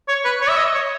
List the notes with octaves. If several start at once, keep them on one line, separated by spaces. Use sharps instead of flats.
C#5
B4
C#5
E5
D#5
C#5